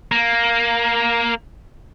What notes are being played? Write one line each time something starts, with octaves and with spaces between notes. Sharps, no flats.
A#3